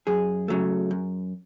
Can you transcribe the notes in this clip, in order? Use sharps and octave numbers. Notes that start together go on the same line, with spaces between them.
F#2 G#4
C#3 F#3 A3
F#2